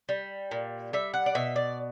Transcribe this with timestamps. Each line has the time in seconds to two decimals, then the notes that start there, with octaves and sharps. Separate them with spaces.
0.09 G3
0.51 A#2
0.93 G3 E5
1.14 F#5
1.26 D5
1.35 B2 E5
1.56 D5